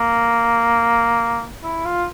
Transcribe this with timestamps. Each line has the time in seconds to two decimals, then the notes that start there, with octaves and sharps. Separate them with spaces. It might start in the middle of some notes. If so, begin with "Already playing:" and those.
Already playing: A#3
1.63 E4
1.85 F4